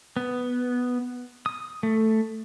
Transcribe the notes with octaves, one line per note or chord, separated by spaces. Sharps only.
B3
D#6
A3